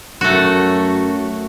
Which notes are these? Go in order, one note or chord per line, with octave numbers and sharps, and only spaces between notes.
F#2 A3 F#4